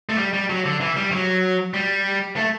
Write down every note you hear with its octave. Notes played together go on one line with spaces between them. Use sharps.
A3
G3
G3
F#3
D3
E3
G3
F#3
G3
A3